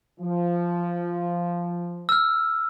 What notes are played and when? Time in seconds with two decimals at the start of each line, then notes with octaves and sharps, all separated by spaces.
0.20 F3
2.09 E6 F6